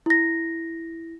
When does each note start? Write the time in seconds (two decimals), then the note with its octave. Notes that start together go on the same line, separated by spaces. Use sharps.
0.06 E4 A#6